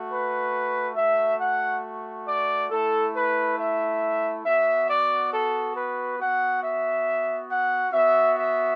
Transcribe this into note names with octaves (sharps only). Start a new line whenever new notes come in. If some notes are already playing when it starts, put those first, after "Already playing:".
Already playing: A3 F#4
B4
A3 F#4 E5
F#5
D5
A3 E4 A4
B4
E5
B3 F#4 E5
D5
A4
B4
B3 F#4 F#5
E5
F#5
B3 F#4 E5
E5